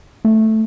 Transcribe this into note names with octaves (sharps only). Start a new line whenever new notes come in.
A3